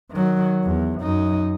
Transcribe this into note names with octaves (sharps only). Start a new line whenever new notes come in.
D#3 F#3
E2
F#2 D#4